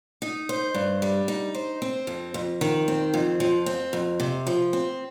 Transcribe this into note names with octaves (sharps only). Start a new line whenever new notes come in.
D#4
C5
G2
G3
D#4
C5
C4
F2
F2
D#3
C4
F2
F3
C4
F2
C3
F3
C4